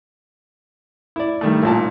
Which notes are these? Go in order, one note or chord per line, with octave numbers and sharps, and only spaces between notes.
E4 D5
G2 D#3 A3
A1 A#2 A5